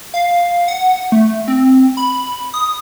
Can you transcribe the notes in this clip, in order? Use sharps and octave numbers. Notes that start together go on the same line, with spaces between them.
F5
F#5
A3
C4
B5
D#6